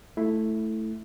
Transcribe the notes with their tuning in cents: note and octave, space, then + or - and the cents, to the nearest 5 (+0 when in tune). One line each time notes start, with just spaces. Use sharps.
A3 +0 E4 +0